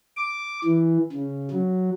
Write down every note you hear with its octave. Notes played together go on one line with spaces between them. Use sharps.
D6
E3
C#3
F#3